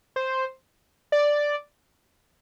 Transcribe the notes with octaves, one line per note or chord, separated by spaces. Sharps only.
C5
D5